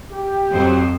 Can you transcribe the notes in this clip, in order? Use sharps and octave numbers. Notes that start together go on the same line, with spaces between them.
G4
F2 F#3 C5